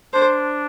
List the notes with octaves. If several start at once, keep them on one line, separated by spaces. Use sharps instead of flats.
D4 C5